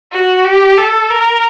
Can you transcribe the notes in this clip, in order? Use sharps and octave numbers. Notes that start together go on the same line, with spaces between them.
F#4
G4
A4
A#4